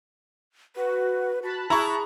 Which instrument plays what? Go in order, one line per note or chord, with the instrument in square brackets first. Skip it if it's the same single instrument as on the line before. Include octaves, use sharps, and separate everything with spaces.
[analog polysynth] F#4 [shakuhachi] B4
[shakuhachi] F#4 [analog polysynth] A5 B5 F#6
[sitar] E4 [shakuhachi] G#4 [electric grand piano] A#5 C#6